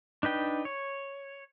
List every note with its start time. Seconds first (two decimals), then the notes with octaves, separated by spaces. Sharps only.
0.23 D4 D#4 B4 G5
0.65 C#5